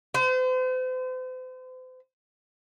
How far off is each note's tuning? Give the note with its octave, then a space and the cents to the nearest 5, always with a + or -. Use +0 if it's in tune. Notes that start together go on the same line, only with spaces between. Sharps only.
C5 -40